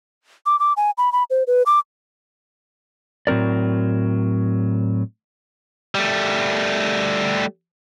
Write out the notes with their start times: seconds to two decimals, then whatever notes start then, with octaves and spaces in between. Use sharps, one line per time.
0.46 D6
0.60 D6
0.77 G#5
0.98 B5
1.12 B5
1.30 C5
1.47 B4
1.66 D6
3.27 A2 F#3 C4 A#4 D5
5.95 G3 A3